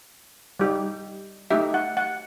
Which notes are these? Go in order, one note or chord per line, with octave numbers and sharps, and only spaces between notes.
G3 D#4 G4
A3 D#4 G4 E5
F#5
F#5